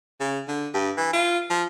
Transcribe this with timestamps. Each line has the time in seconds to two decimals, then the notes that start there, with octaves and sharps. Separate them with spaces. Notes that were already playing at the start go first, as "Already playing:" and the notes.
0.20 C#3
0.48 D3
0.74 G2
0.97 E3
1.13 F4
1.50 F3